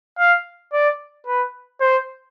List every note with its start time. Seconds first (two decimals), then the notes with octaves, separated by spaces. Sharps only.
0.19 F5
0.73 D5
1.27 B4
1.81 C5